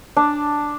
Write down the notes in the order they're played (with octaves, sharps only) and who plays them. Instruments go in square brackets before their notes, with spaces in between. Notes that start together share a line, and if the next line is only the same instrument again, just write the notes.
[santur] D4